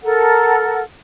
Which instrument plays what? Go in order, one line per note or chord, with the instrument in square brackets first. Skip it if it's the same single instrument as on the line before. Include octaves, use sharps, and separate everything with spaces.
[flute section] A4 A#4 F#5